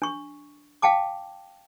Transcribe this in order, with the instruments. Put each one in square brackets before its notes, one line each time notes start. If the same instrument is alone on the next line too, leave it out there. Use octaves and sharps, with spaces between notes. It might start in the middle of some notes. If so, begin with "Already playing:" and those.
[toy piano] D4 C#6
F5 G5 A5 D6